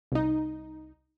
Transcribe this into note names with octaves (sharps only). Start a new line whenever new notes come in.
C2 D#4